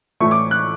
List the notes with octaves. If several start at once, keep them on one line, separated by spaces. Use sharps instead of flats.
A2 E3 A3 C#6
D6
F#6